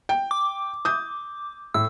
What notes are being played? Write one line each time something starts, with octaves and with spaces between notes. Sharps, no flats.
G5
D6
D#6 G6
A2 E6